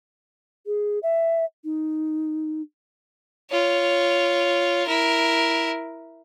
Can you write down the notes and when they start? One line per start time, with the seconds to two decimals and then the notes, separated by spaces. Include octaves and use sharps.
0.66 G#4
1.03 E5
1.64 D#4
3.51 F4 C#5
4.87 E4 A#4